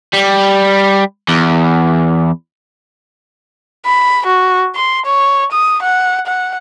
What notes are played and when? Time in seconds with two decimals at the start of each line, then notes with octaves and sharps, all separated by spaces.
0.14 G3
1.28 E2
3.86 B5
4.27 F#4
4.76 C6
5.06 C#5
5.52 D#6
5.82 F#5
6.27 F#5